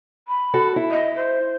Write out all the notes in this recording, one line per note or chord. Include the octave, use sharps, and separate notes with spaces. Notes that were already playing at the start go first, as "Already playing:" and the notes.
B5
F#4 A4
E4
D#5
C5